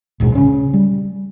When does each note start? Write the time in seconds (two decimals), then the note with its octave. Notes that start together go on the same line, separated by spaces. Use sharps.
0.20 D1 A#1 G#2 B2
0.35 C#3 C#4
0.74 G3